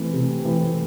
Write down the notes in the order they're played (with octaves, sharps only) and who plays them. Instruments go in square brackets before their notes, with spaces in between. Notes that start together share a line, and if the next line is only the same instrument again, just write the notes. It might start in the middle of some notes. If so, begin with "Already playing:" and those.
Already playing: [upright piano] E3 A3 C4
C3
E3 A3 C4